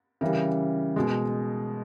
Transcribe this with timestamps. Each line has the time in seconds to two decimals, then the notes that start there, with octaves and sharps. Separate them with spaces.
0.21 C#3 E3 G3 A#4
0.96 B2 G#3